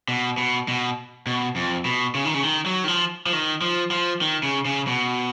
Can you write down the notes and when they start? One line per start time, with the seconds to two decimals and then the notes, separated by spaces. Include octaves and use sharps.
0.08 B2
0.38 B2
0.68 B2
1.27 B2
1.56 F2
1.85 B2
2.15 C#3
2.25 D#3
2.34 C#3
2.44 D#3
2.66 F#3
2.84 D#3
2.88 F3
3.26 F3
3.33 D#3
3.61 F3
3.91 F3
4.21 D#3
4.43 C#3
4.65 C#3
4.87 B2